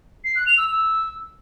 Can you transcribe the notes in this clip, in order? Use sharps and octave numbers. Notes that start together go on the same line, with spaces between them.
C7
F#6
F7
E6
E6